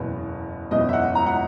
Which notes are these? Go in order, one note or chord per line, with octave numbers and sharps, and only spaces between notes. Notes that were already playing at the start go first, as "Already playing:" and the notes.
Already playing: F#1 E2 B2 B4
F#1 E2 B2 D#5
E5
F#5
A#5
F#5